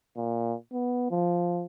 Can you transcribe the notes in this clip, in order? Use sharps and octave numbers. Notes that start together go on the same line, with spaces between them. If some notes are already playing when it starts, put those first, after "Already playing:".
A#2
B3
F3